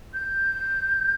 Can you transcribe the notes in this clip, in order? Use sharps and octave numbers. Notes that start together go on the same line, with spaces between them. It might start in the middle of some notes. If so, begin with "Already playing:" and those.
G6